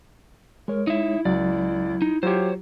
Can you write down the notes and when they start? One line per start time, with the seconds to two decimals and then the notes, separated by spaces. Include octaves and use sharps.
0.68 G#3 A#4 C#5
0.87 D#4 E4 E5
1.25 C#2 F#3 D5
2.02 D#4
2.23 F#3 F4 G4 C5 C#5